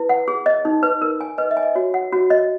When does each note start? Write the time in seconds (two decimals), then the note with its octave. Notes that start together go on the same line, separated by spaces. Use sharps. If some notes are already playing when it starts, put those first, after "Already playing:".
Already playing: E4 B4
0.09 F#5
0.28 G#4
0.46 D#5
0.65 D#4
0.83 B4
1.02 A#4
1.21 G#5
1.38 B4 D#5
1.51 E5
1.57 G#5
1.63 D#5
1.75 F#4 C#5
1.94 F#5
2.13 F#4
2.30 D#5